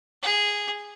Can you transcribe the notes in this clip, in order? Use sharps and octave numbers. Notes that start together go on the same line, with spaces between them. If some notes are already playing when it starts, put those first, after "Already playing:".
G#4